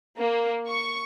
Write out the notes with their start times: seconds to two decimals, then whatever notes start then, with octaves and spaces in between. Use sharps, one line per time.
0.17 A#3
0.67 C#6